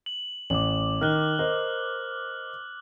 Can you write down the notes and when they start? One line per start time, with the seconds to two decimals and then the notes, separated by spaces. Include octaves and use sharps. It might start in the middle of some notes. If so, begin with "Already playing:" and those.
0.06 F#7
0.50 A1 D6 F#7
1.01 D#3 F6 F#6 G7
1.39 A#4 C5 D#5